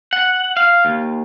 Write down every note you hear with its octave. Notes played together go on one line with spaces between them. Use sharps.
F#5
F5
D#2